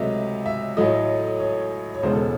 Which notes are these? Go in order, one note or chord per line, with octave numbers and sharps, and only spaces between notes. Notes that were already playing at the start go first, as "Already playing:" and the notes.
Already playing: C#2 C3 F#3 A3 D#5 E5
E5
A1 A2 F#3 A3 D#5
C#5
C#5
E1 E2 C#3 G#3 C5
A4